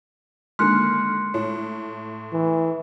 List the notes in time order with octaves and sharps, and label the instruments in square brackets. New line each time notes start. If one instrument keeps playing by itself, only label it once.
[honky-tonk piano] D3 D#3 F6 [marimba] G#3 A#3 [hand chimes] C6 F#6 C#7
[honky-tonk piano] A2 [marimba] C#5
[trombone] E3